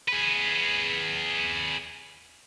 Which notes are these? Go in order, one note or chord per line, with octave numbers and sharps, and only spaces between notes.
G#4 B4